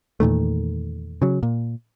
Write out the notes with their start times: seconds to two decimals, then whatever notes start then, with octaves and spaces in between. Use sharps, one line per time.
0.20 E2 A#2 D#3 A3
1.22 C#3 F#3
1.43 A#2